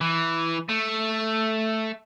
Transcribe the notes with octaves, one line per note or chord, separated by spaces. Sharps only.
E3
A3